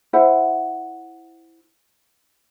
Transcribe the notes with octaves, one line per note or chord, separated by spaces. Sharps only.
E4 C5 E5 F#5